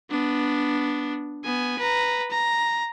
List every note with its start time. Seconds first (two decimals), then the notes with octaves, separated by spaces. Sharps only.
0.11 B3 D4
1.44 B3 G#5
1.79 B4 A#5
2.31 A#5